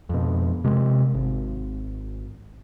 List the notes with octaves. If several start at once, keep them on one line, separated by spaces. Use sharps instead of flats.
F2 B2
C3 G#3
G#1